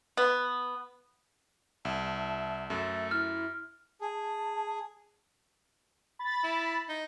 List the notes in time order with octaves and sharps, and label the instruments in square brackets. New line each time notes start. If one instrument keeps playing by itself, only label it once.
[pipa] B3
[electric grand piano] C2 [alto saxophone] E5 [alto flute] A5
[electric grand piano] F#2 [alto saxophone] A3 [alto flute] E5
[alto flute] E4 [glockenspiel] F6
[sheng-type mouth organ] G#4 [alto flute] A5
[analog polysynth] B5 A6
[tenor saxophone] E4
D#4